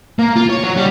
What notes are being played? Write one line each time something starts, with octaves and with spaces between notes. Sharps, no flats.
A#3
F4
C#5
F#3
G3